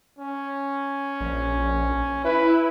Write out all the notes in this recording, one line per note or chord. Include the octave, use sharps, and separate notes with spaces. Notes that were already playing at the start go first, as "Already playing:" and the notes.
C#4
A#1
E4 B4